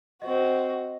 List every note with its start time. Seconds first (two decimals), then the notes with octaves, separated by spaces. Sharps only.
0.22 C4 F#4 D#5